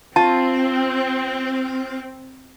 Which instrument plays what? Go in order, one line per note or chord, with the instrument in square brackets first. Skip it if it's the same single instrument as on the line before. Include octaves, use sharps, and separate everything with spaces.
[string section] C4 [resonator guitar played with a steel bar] F4 [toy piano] A5